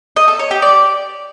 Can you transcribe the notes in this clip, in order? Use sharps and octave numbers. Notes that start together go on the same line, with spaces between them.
D#5
A4
C#5
G4
D5